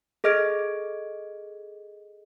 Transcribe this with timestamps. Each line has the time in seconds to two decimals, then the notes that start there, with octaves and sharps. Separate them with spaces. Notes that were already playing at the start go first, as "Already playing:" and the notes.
0.24 G#4 A4 D#5 F6 G#6 D7